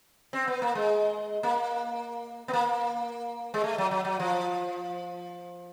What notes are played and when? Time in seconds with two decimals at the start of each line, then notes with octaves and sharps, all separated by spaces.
0.33 C4
0.48 B3
0.62 A#3
0.75 G#3
1.43 A#3
2.48 B3
2.53 A#3
3.54 G#3
3.64 A3
3.78 F#3
3.91 F#3
4.05 F#3
4.20 F3